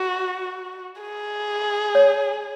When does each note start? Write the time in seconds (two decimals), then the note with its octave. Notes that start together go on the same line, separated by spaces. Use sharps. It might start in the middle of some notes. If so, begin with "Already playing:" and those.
Already playing: F#4
1.02 G#4
1.95 C#5